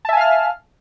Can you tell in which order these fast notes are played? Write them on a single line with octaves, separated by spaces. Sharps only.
A5 E5 G#5 F5 F6